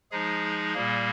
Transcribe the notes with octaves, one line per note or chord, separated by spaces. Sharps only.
F3 G#3 D#4 G#4
A#2 G3 A#3